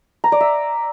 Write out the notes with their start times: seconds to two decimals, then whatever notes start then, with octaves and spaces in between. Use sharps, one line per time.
0.24 A#5
0.32 D5
0.41 E5